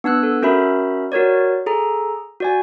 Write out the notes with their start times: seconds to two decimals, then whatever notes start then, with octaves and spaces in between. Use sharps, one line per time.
0.04 B3 D4 E6 F#6
0.23 A4
0.42 C#4 F#4 A#4 E5 B5
1.12 F#4 A#4 C#5 D5
1.66 G#4 A4 A#5
2.40 F#4 D5 G#5